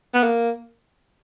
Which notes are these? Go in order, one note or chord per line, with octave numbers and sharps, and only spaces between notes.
B3
A#3